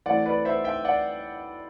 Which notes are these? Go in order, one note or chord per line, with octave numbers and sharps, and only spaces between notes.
E3 A3 C4 E4 D5 F#5
B4 D5
C5 E5
E5 G5
D5 F#5